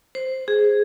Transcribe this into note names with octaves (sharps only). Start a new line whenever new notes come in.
C5
G#4